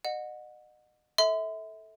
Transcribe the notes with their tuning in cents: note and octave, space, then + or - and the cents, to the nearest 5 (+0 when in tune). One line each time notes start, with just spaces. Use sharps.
D#5 -35 F#5 -25
A4 +0 E5 -30 C6 -40